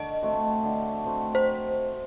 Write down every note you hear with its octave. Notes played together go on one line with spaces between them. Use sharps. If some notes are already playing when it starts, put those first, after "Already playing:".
Already playing: D3 D#5
A3 C4 F#4
D3
A3 C4 F#4
C5